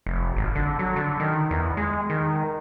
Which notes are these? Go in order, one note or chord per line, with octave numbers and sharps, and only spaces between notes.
F1
G#1
D3
F#3
D3
D#3
E2
G#3
D#3